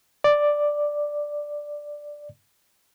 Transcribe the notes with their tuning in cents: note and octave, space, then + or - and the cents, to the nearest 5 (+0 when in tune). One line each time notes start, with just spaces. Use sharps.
D5 +5